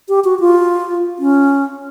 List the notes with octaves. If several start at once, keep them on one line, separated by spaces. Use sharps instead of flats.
G4
F#4
F4
C#4